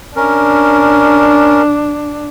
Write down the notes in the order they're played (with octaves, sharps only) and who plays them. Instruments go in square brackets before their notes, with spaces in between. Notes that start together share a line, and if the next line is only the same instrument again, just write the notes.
[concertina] C#4 A#4 [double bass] D4